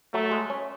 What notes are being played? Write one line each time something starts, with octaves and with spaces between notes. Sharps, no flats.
F#3 A3
G#3
C#4